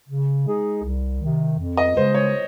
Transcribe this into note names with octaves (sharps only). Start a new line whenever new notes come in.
C#3
G#3 D#4 G#4
C2
C3 D#3
F2
D#5
C#3 G#3 C5
C#5